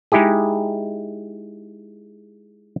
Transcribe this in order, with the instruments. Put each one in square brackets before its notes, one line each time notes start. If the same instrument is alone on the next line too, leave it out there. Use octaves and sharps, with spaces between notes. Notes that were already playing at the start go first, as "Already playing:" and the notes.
[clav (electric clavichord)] G#3 D#4 E4 G4 G#4